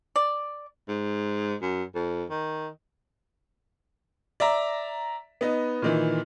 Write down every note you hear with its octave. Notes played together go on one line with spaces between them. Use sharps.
D5
G#2
F#2
F2
D#3
D5 E5 A#5
B3 D#4
A#2 D#3 E3